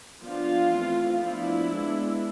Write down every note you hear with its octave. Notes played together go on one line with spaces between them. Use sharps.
F3 B3 D4 F4
E3 A3 C4
F3 B3 D4 E4
G#3 B3 D4